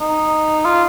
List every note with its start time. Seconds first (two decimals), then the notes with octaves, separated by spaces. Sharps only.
0.01 D#4
0.66 F4